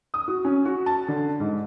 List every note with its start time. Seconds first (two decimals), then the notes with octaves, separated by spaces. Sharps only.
0.14 D#6
0.28 F#4
0.45 C#4
0.65 F#4
0.86 A5
1.08 D3
1.40 G#2